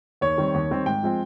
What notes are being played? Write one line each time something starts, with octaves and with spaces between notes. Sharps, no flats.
D#2 C#5
D#3 G3 C4
D#2
D#3 G3 C4
G#2 G5
F3 G#3 C4